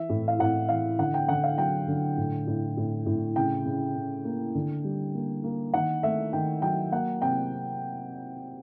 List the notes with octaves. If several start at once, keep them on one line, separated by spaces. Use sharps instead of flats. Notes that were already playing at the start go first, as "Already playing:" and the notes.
Already playing: E3 E5
A2
F5
A2 F#5
E3 F5
D3 F#5
G5
D3 F#5
F5
F#3 G5
D3
A2
A2
A2
A2
C#3 G5
C#3
C#3
A#3
D3
G3
A#3
A#3
D#3 F#5
A3 E5
D#3 G5
F#3 G5
A#3 F#5
C3 G5